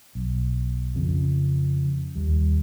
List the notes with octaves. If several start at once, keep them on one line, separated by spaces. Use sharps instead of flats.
B1
F2 C#3
D#2 G3